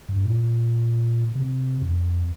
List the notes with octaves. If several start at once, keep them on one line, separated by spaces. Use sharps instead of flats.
G2
A#2
C3
F2